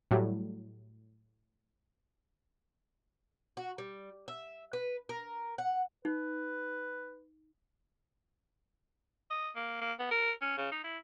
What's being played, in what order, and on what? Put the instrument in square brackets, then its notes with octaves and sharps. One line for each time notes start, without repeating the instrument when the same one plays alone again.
[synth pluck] A2 F#3 G3
[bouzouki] F#4
G3
E5
B4
A#4
F#5
[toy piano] D#4 [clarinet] B4
[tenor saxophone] D#5
A#3
A#3
B3
A#4
C#4
C#3
D#4
E4